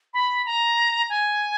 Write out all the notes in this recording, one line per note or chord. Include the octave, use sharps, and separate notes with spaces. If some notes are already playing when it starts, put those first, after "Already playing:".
B5
A#5
G#5